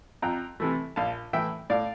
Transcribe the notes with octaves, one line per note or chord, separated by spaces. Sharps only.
F2 G5 A#5
C3 E3 A3
A#1 F5 A5
A2 E3 E5 G5
A2 D5 F5